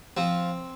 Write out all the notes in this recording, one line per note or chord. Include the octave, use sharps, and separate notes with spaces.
F3 C4